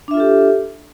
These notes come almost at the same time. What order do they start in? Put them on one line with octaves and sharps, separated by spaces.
D4 E5 F4 A4 G4